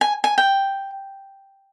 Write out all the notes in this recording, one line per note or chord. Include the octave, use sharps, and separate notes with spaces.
G#5
G#5
G5